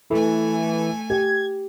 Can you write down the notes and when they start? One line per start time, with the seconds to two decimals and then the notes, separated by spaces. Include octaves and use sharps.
0.10 E3 A3 A4 G#5
1.10 G4 G#6